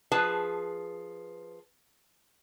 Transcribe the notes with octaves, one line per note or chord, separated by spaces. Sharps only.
F3 G#4 B4 A5